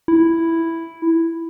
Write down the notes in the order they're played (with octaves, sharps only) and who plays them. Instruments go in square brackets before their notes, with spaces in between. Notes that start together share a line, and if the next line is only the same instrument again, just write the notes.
[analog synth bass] E4